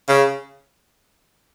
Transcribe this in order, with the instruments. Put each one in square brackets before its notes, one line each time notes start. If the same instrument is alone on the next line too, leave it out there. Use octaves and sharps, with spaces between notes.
[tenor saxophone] C#3